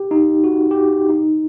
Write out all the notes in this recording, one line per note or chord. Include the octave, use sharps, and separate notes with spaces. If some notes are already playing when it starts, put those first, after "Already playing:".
Already playing: G4
D#4
F#4
G4
F#4
D#4